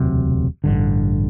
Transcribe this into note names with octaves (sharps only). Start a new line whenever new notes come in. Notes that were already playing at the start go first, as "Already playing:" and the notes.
Already playing: E1 D2 C3 F#3
A1 G2 D3